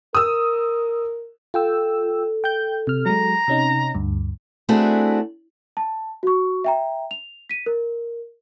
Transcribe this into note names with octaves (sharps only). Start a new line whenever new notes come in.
A#4 D#6 E6
F4 A4 G5 E6
G5 G6
C3 F6
F#3 G#3 A#5
C3 C#4 D#4
D2 G2
A3 C4 D4 E4 F#4 G#4
A5
F#4 C#6
E5 G5 A#5
F7
B6 D#7
A#4